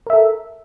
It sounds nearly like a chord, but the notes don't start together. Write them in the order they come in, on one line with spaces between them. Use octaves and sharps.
A#4 E5 A4